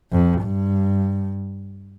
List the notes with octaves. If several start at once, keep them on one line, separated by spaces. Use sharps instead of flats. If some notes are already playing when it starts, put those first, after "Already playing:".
F2
G2